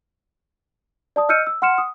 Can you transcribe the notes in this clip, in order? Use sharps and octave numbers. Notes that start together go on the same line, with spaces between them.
D5 A5 D#6
D#5 E6 F6 G6 C#7 D#7
E6
F#5 C6 F6 C#7 E7
D#6